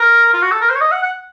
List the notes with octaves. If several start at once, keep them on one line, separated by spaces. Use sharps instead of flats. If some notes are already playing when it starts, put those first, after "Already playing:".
Already playing: A#4
F4
F#4
A4
A#4
C5
C#5
D#5
F#5
F#5